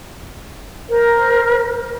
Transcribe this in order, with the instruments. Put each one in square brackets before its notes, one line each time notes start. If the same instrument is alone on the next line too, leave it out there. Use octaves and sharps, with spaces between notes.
[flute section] A#4 C5